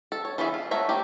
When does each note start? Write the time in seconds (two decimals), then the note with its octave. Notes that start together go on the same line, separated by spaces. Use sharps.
0.12 A4
0.25 C#5
0.38 E3 B3 F4 G#4 E5
0.54 F4
0.71 A3 B3 C#5 E5 A#5
0.89 F3 A#3 G4